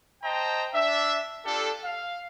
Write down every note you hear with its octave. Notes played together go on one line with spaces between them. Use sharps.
C5 D#5 G5 A5 A#5
D4 E5
D4 F4 G4 A4
F5